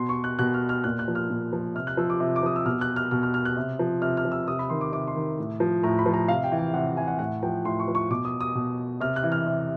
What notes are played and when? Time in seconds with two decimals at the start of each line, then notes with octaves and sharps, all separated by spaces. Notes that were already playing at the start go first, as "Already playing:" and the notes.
Already playing: B2 C6
0.09 C#6
0.24 F#6
0.39 B2 F#6
0.54 F6
0.69 F6
0.84 A#2 F#6
0.99 F#6
1.08 F3
1.15 F6
1.30 A#2
1.53 F3
1.75 C3 F6
1.87 F#6
1.97 F3 E6
2.10 D6
2.20 C3
2.36 D6
2.43 F3 D#6
2.56 E6
2.65 B2 F6
2.81 F#6
2.96 F6
3.11 B2 F6
3.23 F6
3.34 F6
3.45 F#6
3.57 C3
3.79 F3
4.02 C3 F6
4.17 F6
4.25 F3
4.32 E6
4.48 C3 D#6
4.59 B5
4.70 D#3 C6
4.81 D6
4.92 C3 D6
5.07 C6
5.16 D#3
5.39 A2
5.60 F3
5.83 A2 A#5
5.99 B5
6.06 F3
6.14 A#5
6.28 C3 F5
6.44 G5
6.52 E3
6.58 G5
6.74 C3 F#5
6.97 E3 G#5
7.08 F#5
7.19 A2 F#5
7.43 F3 G5
7.65 A2 C6
7.80 C#6
7.88 F3
7.95 C#6
8.10 B2 D6
8.25 D#6
8.41 D#6
8.55 B2
9.01 C3 F6
9.16 F#6
9.23 E3
9.32 F6
9.47 C3